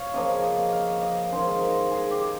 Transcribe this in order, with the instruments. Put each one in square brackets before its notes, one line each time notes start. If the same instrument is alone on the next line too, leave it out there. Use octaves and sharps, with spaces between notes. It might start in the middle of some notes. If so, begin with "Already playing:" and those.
Already playing: [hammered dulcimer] C#5 F5
C#3 F3 A#3 C#4 D#5
D#5
F5
D#5
D#3 G#3 C#4 C5
A#4
G#4
G4